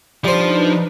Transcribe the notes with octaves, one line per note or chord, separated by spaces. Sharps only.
F3 G3 D4 D#4 B4 C5